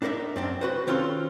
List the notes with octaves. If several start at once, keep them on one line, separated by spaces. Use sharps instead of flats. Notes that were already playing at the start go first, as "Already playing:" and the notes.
D4 D#4 A#4 C5 E5
F#2 C4 D4
F#4 B4 C5
D#3 C4 C#4 F4 A4 C6